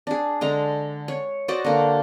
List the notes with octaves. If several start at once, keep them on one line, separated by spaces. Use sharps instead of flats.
D4 G#4
D3 G#3 A#5
C#5
F#4 C5 D5 D#5
D3 A#3